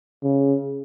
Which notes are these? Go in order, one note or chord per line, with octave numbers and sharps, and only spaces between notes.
C#3